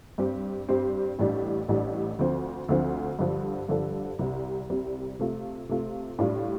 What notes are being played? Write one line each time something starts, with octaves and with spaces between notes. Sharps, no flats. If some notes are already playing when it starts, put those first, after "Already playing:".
G2 G3 C4 G4
G2 G3 C4 G4
A1 A2 G3 D4
A1 A2 G3 D4
D2 D3 F3 C4
D2 D3 F3 C4
G2 D3 F3 D4 A4
G2 D3 F3 D4 A4
C2 C3 G3
C2 C3 G3
C3 A3 F4
C3 A3 F4
A2 G3 D4 F4